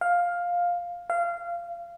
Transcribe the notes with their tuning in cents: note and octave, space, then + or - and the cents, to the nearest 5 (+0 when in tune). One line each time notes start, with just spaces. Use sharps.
F5 +10
F5 -20